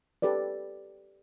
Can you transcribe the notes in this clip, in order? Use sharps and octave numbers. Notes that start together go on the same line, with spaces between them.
G4 A4 B4 D5